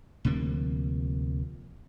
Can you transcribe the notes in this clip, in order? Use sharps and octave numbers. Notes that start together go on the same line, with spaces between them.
D2 C3 F3 A#3